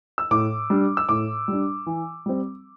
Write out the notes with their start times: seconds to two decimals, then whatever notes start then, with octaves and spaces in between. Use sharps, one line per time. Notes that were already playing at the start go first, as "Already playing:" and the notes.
0.18 E6
0.31 A2 D6
0.70 G3 D4
0.97 E6
1.09 A2 D6
1.48 G3 D4
1.86 E3
2.26 G3 C4